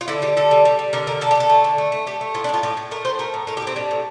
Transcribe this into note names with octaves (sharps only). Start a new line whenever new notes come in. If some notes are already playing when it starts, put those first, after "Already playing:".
F4
D3 E4
G3 G4
D3 A4
G3
G3
G3
D3 A#4
D3 A#4
D3 A4
G4
D3 A4
A3
D3
A3
A3
A3 G4
A3
A2 F4
D4
A2 F4
A2 G4
A2
A3 A#4
A2 C5
A3 A#4
A2
A2 A#4
G4
G3 C4
G3 D4
A2